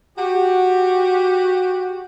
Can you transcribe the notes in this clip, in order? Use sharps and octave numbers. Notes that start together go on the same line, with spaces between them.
F#4 G4